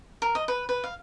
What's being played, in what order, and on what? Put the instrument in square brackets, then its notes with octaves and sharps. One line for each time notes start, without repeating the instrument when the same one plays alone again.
[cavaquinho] A#4
D#5
B4
B4
F5